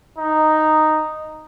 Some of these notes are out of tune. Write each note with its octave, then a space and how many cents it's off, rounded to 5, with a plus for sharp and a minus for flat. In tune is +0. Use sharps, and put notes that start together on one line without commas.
D#4 -5